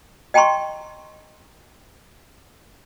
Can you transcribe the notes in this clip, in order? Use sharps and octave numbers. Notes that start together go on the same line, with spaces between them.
D#5 G5 A5 A#5 C6 C#6